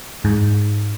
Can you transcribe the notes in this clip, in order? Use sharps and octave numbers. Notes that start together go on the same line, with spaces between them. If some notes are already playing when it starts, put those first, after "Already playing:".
G#2